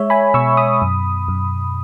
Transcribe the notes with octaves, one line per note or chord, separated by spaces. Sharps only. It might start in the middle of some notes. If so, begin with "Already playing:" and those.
Already playing: G#3 C#5 E5
G#5 B5
B2 C#6 E6
B5 D#6
F#2
F#2